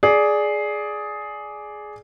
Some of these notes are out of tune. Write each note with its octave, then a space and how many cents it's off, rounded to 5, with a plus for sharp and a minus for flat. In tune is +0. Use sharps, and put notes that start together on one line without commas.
G#4 +10 D5 +0